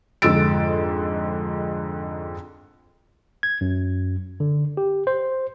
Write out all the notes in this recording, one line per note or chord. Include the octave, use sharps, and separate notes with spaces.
F2 G#2 D3 E6 A6 D7
G#6
F#2
D3
G4
C5